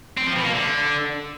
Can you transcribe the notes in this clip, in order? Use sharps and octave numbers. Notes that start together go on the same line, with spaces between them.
C4
F3
B2
A#3
D3